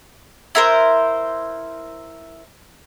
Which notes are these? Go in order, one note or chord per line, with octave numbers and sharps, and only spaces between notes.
E4 A#4 C5